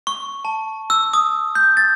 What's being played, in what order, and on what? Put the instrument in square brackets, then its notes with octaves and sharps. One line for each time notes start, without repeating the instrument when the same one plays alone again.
[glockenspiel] C#6
A5
E6
D#6
G6
A6